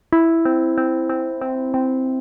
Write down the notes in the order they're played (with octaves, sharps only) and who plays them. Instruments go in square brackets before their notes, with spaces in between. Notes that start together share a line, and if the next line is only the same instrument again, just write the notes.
[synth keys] E4
C4
C4
C4
C4
C4